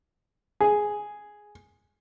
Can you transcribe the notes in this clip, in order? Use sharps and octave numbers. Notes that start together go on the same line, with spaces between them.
G#4